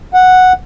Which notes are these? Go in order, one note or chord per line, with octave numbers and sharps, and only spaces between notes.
F#5